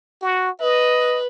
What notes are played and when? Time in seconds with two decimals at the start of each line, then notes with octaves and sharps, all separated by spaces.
0.22 F#4
0.61 B4 D#5